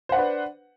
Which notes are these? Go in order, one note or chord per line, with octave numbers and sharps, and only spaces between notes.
D4 B4 C5 F#5